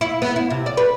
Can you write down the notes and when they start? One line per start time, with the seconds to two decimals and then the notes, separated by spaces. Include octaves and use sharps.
0.01 E4
0.22 B3
0.36 E4
0.50 C3
0.66 D5
0.77 B4